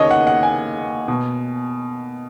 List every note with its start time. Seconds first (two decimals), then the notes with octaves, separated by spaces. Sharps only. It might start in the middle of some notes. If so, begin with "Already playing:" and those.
Already playing: D#2 C#3 C#5 D#5
0.11 F#5
0.27 F#5
0.43 G#5
1.08 B2